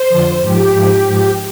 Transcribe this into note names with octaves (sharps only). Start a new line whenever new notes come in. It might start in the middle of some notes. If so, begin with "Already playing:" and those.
Already playing: C5
F2 D3 F3
G#2 F3 G4
G#2 F3
G#2 F3